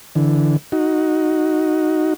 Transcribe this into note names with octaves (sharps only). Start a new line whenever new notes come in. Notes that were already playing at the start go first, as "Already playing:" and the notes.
D3 E3
D#4 F#4